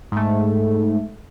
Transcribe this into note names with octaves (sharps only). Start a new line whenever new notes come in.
G#2 A3